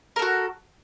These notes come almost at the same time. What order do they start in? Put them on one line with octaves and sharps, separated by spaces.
A#4 A4 F#4